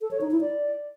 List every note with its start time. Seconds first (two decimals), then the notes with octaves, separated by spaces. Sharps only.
0.01 A4
0.11 C#5
0.21 D#4
0.31 E4
0.41 D5